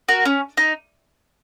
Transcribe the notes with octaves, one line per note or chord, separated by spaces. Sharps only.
F#4 A#4
C#4
D#4